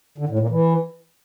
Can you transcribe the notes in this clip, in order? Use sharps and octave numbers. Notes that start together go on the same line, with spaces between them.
D3
A2
A#2
E3